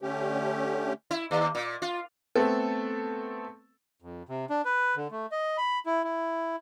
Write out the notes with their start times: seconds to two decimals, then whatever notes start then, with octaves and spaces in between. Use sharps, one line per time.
0.02 D3 A3 C#4 G4
1.11 E4
1.31 D#2
1.55 A#2
1.82 F4
2.36 A3 B3 C4 A4
4.02 F2
4.29 C3
4.50 D4
4.65 B4
4.96 D3
5.11 A3
5.31 D#5
5.57 B5
5.86 E4
6.04 E4